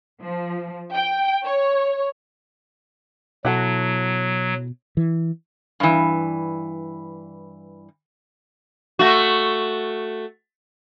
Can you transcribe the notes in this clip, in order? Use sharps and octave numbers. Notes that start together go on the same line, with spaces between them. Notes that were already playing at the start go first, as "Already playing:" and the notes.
F3
G5
C#5
B2 F#3 E4 F#4 A4
E3
G2 E3
A3 F#4